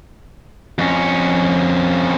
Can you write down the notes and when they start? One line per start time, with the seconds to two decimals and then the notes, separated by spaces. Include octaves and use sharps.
0.79 F2 C#4